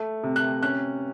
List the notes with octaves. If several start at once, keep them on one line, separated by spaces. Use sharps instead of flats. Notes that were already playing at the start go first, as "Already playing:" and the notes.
Already playing: A3
C3
F#6
C#4 F#6